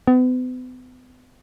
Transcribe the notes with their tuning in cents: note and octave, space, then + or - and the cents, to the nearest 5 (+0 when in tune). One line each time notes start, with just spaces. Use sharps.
B3 +40